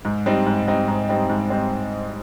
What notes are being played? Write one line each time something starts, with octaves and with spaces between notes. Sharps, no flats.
G#2
G3 C4 D#4
G#2
G3 C4 D#4
G#2
G3 C4 D#4
G#2
G3 C4 D#4